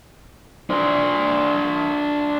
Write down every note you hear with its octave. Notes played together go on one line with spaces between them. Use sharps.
D4 C5